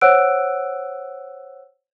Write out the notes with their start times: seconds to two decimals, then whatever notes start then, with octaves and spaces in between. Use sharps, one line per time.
0.01 C5 C#5 F#5 E6 F#6 D7